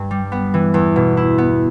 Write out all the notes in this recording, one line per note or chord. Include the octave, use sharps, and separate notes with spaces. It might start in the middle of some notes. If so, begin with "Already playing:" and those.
Already playing: G2
G3
B3
E3
E2
B2
E4
B3